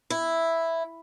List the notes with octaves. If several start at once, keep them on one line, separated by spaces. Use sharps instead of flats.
E4